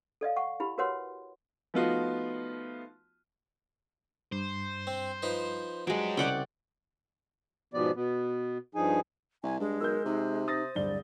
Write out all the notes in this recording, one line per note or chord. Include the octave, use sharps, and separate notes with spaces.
A4 D5 D#5 F5
F#5 C#6
E4 G4 B5
F#4 A#4 B4 C#5 F#5 C6
F3 A3 B3 D#4 F4 F#4
G2 C5
C4
F3 D#4 B4
F#3 G#3 D4 G4
C2 C#3 D5 F#5 G5
G#2 B2 F3 B3 G4 D5
B2 B3
G2 F3 D#4 G#4 G#5
C2 G#5
G2 G#3
B1 A#4 E6 G6
C3 D#4
C5 D#6 A6 A#6
D1 G2 D5 G7